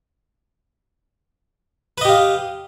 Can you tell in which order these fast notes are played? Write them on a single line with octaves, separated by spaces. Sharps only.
B4 D#5 G4 F5